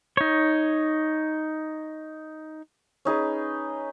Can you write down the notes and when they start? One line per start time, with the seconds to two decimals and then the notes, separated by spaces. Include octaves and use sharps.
0.17 D#4 C#5
3.05 C#4 D#4 G#4 B4